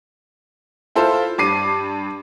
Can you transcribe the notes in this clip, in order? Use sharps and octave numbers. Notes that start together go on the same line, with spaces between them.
E4 F4 A4 C5
G2 D6 C7 D#7